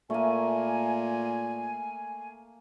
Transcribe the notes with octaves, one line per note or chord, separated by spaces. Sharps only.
A#2 A3 A#3 G#5